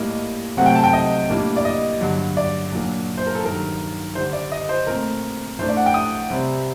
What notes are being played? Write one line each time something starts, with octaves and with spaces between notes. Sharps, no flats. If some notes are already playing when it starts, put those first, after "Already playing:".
Already playing: A2 G3 A#3 D#5
C3 F#3 A3 C4 F#5
G5
A5
G5
D#5
A2 G3 A#3 D4
D5
D#5
G2 D3 F#3
D5
A#2 F#3 A#3 D4
C5
A#4
A4
G2 D#3 F#3 A#4
D3 G3 D4 C5
D5
D#5
C5
A#2 A3 C4 A#4
A2 A3 D4 C5
D5
F#5
G5
D#6
C3 G3 C4